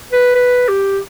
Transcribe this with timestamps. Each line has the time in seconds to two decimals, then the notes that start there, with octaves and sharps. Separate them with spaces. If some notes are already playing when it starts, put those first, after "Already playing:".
0.12 B4
0.35 B4
0.68 G4